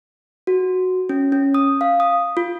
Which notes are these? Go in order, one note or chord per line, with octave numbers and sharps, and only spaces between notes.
F#4
C#4
C#4
D#6
F5
D#6
F4